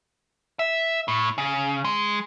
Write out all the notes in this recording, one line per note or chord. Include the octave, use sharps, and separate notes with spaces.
E5
A2
C#3
G#3